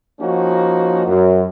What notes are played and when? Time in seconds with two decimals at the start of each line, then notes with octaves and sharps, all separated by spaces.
0.19 F3 A#3 C#4 D#4 F#4
1.05 F#2